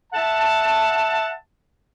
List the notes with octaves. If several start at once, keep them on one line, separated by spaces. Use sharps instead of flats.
E5 F#5 A5